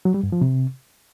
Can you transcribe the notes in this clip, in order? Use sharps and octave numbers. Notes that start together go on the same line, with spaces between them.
F#3
G3
G2
F3
C3